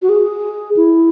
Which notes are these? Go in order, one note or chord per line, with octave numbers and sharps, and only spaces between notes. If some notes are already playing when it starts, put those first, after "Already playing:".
F#4
G#4
E4